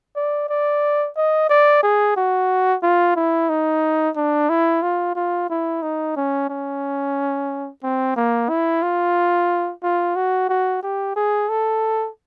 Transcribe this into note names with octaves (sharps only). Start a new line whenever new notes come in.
D5
D5
D#5
D5
G#4
F#4
F4
E4
D#4
D4
E4
F4
F4
E4
D#4
C#4
C#4
C4
A#3
E4
F4
F4
F#4
F#4
G4
G#4
A4